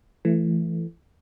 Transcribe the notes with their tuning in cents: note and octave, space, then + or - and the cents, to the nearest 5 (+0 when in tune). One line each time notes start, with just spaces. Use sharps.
E3 +25 A3 +0